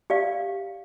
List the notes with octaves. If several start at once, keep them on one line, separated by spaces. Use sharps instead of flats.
G4 D5 F5